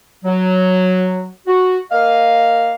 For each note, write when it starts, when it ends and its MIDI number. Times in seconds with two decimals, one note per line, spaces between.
0.25 1.28 54
1.47 1.79 66
1.91 2.75 58
1.91 2.75 75
1.91 2.75 77